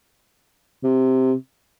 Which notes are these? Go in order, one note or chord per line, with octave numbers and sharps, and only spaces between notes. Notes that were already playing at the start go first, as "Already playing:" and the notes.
C3